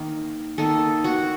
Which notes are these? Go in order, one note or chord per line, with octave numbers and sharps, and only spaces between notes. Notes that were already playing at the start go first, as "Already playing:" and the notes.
Already playing: D#3 A#3
D#3 A#3 A4
F#4